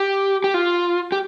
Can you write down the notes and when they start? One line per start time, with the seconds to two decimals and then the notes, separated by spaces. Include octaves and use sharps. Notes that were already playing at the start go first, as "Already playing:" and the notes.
Already playing: G4
0.44 G4
0.54 F4
1.12 G4